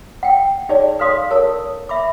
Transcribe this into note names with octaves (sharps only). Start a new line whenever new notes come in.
F#5 G5
D#4 G#4 C#5 D5 A5
A4 B4 C#5 F5 C6 D#6
A4 A#4 C#5 A5
E5 B5 D6